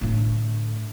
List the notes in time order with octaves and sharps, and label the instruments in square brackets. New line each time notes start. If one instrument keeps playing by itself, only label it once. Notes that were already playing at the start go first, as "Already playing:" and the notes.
[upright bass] A2 D3